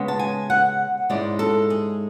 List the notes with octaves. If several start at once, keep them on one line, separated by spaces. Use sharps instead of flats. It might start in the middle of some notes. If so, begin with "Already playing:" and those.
Already playing: C#3 G#3 B3
A5
G#5
F#5
G#2 G#3 C#4 E4 D5
A4
G#4